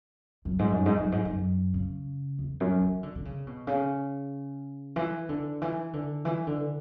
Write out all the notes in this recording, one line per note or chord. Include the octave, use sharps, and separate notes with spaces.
F#2
G#2
F#2
G#2
F#2
G#2
F#2
C#3
E2
F#2
E3
D3
D3
C#3
B2
C#3
E3
D3
E3
D3
E3
D3